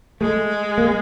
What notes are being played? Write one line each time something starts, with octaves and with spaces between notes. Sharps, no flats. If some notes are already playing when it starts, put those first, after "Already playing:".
G#3 A3
A#3